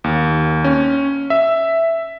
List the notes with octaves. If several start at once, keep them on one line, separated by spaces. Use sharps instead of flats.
D#2
C#4
E5